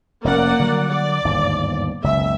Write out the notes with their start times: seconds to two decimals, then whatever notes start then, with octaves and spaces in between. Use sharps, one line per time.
0.24 F1 A#3 C#4 D5 F#5
0.59 D3 F#3 G3
0.89 D5
1.24 G1 D#2 G#2
2.04 F#1 C#2 B2 E5